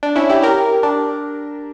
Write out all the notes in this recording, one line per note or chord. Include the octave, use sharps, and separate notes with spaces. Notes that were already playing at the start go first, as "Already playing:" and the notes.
D4
C#4 E4
E4 G4
G4 A#4
D4